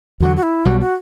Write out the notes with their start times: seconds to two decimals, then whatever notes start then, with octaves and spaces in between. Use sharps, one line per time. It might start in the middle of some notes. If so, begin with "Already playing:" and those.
0.20 E2 D3 F#3 F#4
0.36 F#4
0.43 E4
0.65 B1 B2 G3 F#4
0.80 F#4